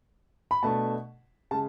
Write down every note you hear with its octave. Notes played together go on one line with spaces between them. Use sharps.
B5
B2 A3 D4 A5
C#3 G#3 A5